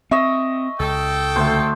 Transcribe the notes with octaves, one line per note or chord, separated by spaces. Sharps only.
C4 D#5 E5 C#6
C#2 A4 G5
D2 A3 C5